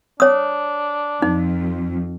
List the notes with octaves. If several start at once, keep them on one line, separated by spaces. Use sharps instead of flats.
D4 C#5 D#6
F2 D#4